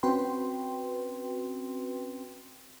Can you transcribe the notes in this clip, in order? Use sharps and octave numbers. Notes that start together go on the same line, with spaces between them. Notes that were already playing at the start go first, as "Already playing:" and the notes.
C4 C#4 F#4 B4 G5 C6